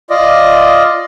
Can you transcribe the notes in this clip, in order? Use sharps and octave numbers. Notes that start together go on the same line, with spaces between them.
F4 D5 D#5